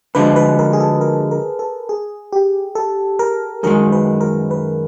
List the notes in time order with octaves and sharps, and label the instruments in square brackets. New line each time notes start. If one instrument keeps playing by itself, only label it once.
[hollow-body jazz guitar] D2 D3 F3 G#3 [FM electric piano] B4
[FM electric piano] B4
A#4
G#4
A4
A#4
A#4
A4
G#4
G4
A4
A#4
[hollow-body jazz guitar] F#2 D#3 G#3 [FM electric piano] A#4
[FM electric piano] B4
A#4
B4